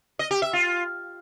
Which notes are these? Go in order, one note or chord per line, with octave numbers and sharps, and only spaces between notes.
D#5
G4
E5
F4